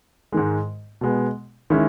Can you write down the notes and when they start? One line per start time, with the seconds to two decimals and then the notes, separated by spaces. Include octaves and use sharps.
0.32 G#2 D#3 G#3
1.01 B2 G#3 B3
1.70 D#3 G#3 C#4 E4